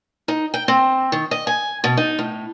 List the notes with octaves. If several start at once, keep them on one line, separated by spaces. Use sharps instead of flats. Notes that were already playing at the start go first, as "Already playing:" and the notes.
D#4
G5
C4
D#3
D#5
G#5
B2
D#4
A2